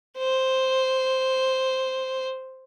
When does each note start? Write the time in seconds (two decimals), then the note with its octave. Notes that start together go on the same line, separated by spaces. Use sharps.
0.18 C5